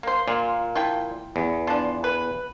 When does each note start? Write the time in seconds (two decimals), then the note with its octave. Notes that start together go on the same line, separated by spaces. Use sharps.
0.03 A#3 C5
0.28 A#2 F4
0.75 F3 E4 G5
1.36 E2
1.67 F3 D4
2.04 B4